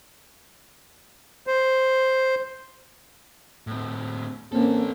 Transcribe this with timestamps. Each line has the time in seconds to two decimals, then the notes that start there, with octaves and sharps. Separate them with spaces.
1.47 C5
3.67 A2 C4
4.52 E3 A#3 C4 C#4 A4